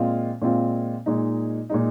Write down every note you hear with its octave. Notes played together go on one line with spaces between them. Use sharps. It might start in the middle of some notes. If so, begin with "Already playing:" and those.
Already playing: A#2 G#3 C4 F4
A#2 G#3 C4 F4
A#2 G#3 D#4
A#2 G#3 D#4